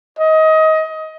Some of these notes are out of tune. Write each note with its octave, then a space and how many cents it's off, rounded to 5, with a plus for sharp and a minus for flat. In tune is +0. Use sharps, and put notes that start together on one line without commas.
D#5 +25